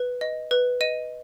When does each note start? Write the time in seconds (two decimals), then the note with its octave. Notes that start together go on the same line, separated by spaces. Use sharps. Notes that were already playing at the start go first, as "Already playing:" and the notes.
Already playing: B4
0.21 D#5
0.51 B4
0.81 D#5 D#7